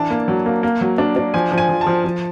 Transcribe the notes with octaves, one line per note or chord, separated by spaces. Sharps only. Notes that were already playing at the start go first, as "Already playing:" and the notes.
Already playing: E3 D4 A5
A#3
F#3
A#3
A#3
F#3
D4
D4
F3 G#5
F3
G#5
F3
A5
F3
F3